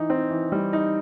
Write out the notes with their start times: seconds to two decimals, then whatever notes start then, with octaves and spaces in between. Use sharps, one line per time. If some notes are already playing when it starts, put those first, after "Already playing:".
Already playing: E3 D#4
0.10 C4
0.30 E3
0.52 G3
0.73 D#4